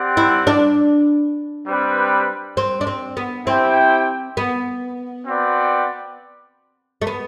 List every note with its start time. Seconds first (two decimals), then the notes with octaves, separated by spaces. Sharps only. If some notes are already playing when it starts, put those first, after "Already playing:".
Already playing: C4 G4 D5 F#5
0.17 E4
0.47 D4
1.67 G3 C4 G4 B4
2.57 C4
2.81 D4
2.87 C4
3.17 B3
3.47 C4 E4 G4 C5 G5
4.37 B3
5.26 C4 F#4 B4 D5 G5
7.02 A3
7.07 B3